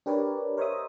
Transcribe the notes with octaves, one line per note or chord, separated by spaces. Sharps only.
D4 G4 A#4 B4 C#5 D5
A#4 C5 C#5 D#5 E5 D#6